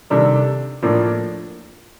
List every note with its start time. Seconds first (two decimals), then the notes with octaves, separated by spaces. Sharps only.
0.10 C3 D#3 G3 D4 A4
0.83 A2 F3 A#3 D4